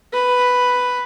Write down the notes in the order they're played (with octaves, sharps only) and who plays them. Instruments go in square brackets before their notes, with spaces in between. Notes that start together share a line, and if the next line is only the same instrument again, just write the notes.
[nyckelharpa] B4